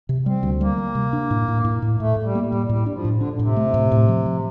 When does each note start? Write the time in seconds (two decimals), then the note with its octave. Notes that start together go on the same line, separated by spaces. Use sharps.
0.09 C3
0.26 G3 C4
0.43 D2
0.61 G3 A#3
0.78 G3
0.95 C3
1.13 D4
1.31 A2
1.48 A2
1.65 A2
1.82 A2
1.99 A2 A3
2.17 A2
2.23 G3
2.35 A#3
2.46 G3
2.52 A2
2.69 A2 G3
2.86 G3 D4
2.93 F3
3.05 A2
3.15 D3
3.21 D4
3.33 D3
3.39 A2 C3
3.56 A3
3.74 A2
3.92 A2
4.08 F3
4.26 F3